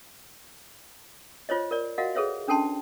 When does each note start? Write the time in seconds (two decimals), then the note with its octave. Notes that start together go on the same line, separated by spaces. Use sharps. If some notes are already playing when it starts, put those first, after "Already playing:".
1.49 F4 C5 C#5 D#5
1.71 A#4 D5
1.98 F#4 A#4 D#5 F5 F#5
2.15 G#4 A4 B4 C#5 E5
2.48 C#4 D4 A4 G5 A5 C6